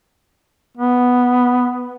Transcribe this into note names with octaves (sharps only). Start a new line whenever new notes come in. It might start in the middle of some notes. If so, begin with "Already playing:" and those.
B3